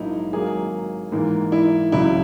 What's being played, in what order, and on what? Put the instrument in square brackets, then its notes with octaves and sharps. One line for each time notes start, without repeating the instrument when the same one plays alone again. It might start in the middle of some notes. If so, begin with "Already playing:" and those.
Already playing: [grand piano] A#1 G#2 F#3 A#3 D#4 E4
G#1 G#2 F#3 A#3 G#4
G#2 E3 A#3
E4
C#2 C#3 F#3 E4